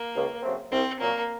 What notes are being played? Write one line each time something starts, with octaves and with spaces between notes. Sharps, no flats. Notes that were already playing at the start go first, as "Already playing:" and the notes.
Already playing: A#3
C#2
C#3 F#3 A3 C4
C2 C4
A#2 F#3 A#3